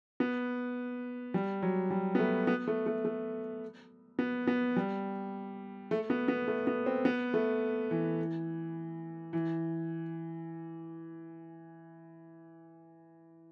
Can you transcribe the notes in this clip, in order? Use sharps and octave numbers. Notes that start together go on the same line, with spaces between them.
B3
G3
F#3
G3
B3
A3
B3
A3
A3
A3
B3
B3
G3
A3
B3
B3
A3
B3
C4
B3
A3
E3
E3